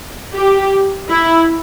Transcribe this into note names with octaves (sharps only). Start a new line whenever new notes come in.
G4
E4